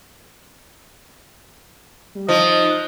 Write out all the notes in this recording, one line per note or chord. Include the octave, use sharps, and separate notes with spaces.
G3
F3 D#4 D#5
F#6